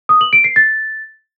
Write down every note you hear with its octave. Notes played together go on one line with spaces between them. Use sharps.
D#6
F#7
D7
C7
A6